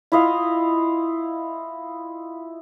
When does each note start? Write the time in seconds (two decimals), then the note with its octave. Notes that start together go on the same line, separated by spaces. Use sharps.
0.12 E4 F4 D#5 F5